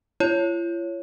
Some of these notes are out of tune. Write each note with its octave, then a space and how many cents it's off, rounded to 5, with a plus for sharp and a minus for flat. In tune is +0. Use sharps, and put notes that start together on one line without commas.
F4 -45 C#5 +0